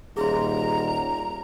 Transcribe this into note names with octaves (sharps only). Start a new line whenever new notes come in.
D#1 G#4 A#5 C6